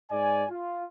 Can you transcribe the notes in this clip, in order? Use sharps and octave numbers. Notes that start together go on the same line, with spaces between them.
G#2 D5 G#5
F4